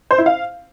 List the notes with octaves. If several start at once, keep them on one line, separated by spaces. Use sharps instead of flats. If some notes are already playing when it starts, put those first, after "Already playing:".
C5
E4
F5